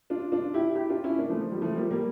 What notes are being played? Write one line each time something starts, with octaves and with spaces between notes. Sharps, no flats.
D4 F4
D4 F4
E4 G4
E4 G4
D4 F4
C#4 E4
A#3 D4
F3 A3
F3
G3
F3 A3
G3 A#3
G3 A#3